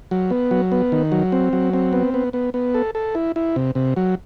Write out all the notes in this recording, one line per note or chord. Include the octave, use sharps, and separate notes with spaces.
F#3
B3
F#3
B3
D#3
F#3
C4
F#3
C4
B3
B3
B3
B3
A4
A4
E4
E4
C3
C3
F#3